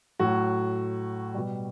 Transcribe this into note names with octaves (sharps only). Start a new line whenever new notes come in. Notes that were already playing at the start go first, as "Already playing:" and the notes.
A2 F#3 F#4
B2 G3